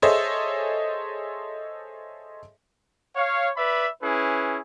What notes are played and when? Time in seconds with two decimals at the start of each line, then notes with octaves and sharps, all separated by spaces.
0.02 G#4 A4 C5 C#5 D#5 E5
3.16 C#5 F5
3.57 B4 D5 E5 B5
4.02 C#4 E4 G#4 B4